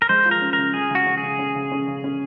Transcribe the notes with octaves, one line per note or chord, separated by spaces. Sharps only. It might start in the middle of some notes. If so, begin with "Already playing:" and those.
A#4
G#3 C5
F3
A#4
C#4
A#4
C#3
G#3 G#4
C#3 F#4
C#4
G#4
C#3
C#4
C#3
C#4
C#3
C#4